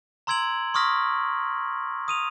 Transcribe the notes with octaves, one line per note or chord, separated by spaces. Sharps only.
A#5 C6 E6 G#6 D7 F#7
C6 C#6 D#6 F6 A#6 B6
D#6 D#7 F7